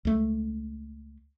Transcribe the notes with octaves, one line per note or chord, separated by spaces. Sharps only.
C#2 A3